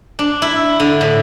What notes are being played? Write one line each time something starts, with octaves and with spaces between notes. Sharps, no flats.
D4
E4
D3
A2